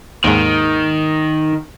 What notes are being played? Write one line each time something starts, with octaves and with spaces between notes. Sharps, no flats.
D#2 G#2 D#3